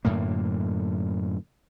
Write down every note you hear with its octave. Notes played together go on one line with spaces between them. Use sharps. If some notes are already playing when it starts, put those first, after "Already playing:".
F#2 A2 D3 A#3